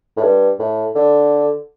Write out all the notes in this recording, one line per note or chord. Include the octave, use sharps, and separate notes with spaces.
A2
G2
A2
D3